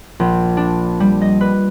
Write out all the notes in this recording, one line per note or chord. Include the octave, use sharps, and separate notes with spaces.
A#1
D4
G3
D#5
B4